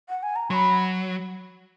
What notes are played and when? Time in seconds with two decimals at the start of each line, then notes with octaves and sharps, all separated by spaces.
0.09 F#5
0.23 G#5
0.36 A#5
0.50 F#3 B5 C#6